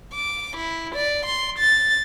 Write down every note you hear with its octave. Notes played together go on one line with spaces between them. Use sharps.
D6
E4
D5
C6
A6